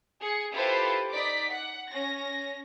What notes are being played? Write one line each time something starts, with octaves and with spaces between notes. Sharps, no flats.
G#4 C#7
E4 F4 G4 A4 B4 C5
D#4 D5 D6 B6
F#5
C#4 A#6